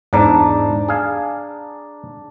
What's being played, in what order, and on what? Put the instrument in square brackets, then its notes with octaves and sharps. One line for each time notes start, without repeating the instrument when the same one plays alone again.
[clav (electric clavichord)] E2 G#2 [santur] D4 A5 A#5
[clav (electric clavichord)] G#4 F5